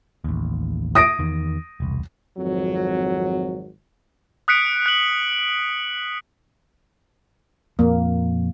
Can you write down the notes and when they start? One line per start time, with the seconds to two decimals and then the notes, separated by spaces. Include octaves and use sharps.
0.24 A1 D#2
0.95 D#6 A#6 D7
1.19 E2 D#3
1.80 E1 C2
2.38 G#1 F2 F#3
4.48 D#6 F#6 B6 C#7 D7
4.86 F#6 F#7
7.79 F2 A#2 A#3